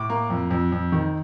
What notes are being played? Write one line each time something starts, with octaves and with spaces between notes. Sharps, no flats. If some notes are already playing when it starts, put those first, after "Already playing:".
Already playing: A2 D6
A#3
F2
F2
F2
D#3